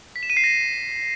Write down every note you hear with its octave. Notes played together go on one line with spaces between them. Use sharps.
B6
E7
D#7
C7
A#6